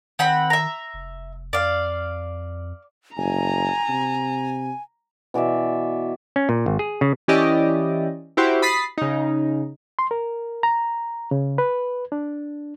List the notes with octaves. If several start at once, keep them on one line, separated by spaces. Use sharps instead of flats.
D#3 C4 F#5 B5
E5 A#5
F1
F2 D5 F5
F#1 G#5 A#5
C3
B2 E3 D5 E5
C#4
A#2
G#1
G#4
C#3
E3 C#4 E4 G4 D5 D#5
E4 F#4 G4 C5
B5 D#6 A6 B6 C7
C#3 D#4
C6
A#4
A#5
C#3
B4
D4